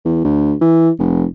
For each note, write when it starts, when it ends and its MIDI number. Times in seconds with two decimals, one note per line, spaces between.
0.05 0.23 40
0.24 0.55 38
0.61 0.90 52
0.99 1.25 29